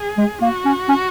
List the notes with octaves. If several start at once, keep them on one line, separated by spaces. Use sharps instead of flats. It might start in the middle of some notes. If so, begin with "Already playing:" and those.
Already playing: G#4
G#3
A#3 F#4
C#4
C#4